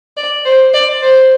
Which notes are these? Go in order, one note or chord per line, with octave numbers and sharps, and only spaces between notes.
D5
C5
D5
C5